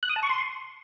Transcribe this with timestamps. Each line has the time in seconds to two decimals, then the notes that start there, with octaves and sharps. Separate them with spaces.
0.03 F#6
0.09 D#6
0.16 A5
0.23 C#6
0.29 C6